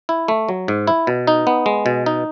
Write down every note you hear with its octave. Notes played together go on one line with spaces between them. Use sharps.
E4
A3
F#3
G#2
E4
B2
D#4
B3
G#3
B2
D#4